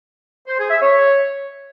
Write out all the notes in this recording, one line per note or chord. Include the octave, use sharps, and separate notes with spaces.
C5
G#4
E5
C#5